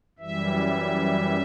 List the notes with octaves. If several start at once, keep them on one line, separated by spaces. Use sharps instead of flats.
F#2 E3 G3 E5